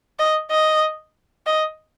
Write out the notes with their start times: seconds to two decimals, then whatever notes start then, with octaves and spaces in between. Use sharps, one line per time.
0.19 D#5
0.51 D#5
1.46 D#5